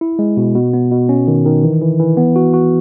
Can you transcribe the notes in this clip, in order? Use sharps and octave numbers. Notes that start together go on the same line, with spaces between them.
E4
G#3
B2
B2
B3
B2
C#4
D#3
D#3
E3
E3
E3
B3
F#4
F#4